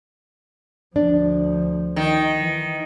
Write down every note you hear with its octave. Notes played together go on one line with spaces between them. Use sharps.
D2 F3 D4
D#3
E3